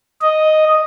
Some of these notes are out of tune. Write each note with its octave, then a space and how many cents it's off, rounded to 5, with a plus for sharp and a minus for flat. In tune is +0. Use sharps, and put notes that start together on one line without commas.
D#5 +0